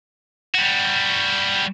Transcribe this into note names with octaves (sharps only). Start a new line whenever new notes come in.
G3 F#4